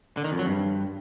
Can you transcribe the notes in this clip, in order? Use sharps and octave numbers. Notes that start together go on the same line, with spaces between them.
D3
D#3
F2
F#3
G2